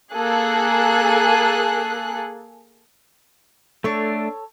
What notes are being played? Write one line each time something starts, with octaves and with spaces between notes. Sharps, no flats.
A#3 G#4 A4 F#6
A3 D4 A4 C#5